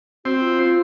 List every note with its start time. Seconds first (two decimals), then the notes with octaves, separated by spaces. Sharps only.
0.25 C4 F#4
0.40 F4